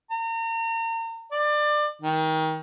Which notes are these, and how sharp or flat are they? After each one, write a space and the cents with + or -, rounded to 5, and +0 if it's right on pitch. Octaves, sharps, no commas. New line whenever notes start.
A#5 -40
D5 +25
D#3 +25